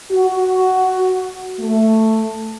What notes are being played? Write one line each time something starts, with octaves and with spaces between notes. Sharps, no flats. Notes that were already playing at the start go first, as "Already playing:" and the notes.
F#4
A3